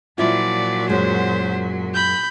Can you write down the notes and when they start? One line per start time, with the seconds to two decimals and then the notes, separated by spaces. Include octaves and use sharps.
0.18 A#2 F3 F#3 E4 F4 D5
0.89 F#2 G#3 C5
1.94 B5 G6